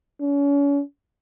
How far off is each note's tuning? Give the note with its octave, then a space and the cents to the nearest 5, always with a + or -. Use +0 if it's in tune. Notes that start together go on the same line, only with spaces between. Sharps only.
C#4 +35